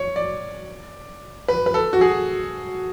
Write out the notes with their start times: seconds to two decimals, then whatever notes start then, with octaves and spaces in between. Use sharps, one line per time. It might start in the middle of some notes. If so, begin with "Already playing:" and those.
Already playing: C#5
0.16 D5
1.48 B4
1.66 B4
1.74 A4
1.93 F#4
2.01 G#4